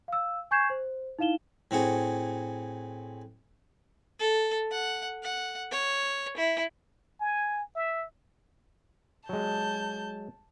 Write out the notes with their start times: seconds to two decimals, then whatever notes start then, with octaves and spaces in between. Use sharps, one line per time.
0.08 F5 E6
0.51 G#5 C#6 G6 G#6 C7 E7
0.70 C5
1.19 D#4 E4 F5 E7 G7
1.71 A2 C4 F#4 G#4
4.20 A4
4.71 F#5
5.23 F#5
5.71 C#5
6.37 E4
7.20 G#5
7.76 E5
9.29 F#3 G#3 A5 G6